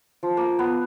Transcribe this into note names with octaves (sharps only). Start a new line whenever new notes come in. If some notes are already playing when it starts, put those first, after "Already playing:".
F3
A#3
B3